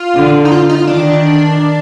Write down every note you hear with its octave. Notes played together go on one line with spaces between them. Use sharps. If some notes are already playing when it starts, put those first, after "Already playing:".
Already playing: F4
D3
D#4
F4
D#4
F4
D#3 D4